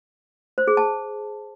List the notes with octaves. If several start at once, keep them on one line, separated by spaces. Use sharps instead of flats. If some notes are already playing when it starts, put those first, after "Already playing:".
C5
G#4
A5